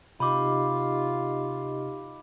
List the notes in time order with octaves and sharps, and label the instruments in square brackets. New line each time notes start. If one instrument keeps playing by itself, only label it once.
[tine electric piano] C3 [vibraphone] D#4 G4 D#5 [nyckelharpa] F4 [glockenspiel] B5 D6